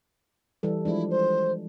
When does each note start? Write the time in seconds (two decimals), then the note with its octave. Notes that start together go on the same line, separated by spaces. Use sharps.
0.63 E3 G3 A4
0.85 F3 G#3 D4 E4
1.10 C5